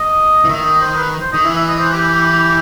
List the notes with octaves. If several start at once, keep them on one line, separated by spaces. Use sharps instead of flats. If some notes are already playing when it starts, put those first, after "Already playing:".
Already playing: D#5
E3
D#3 E5
D#5
C5
B4
C5
D#3 D#5
E3 E5
E5
D#5
C5
G4